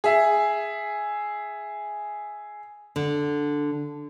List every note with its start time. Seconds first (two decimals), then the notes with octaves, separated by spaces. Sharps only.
0.04 G#4 E5
2.96 D3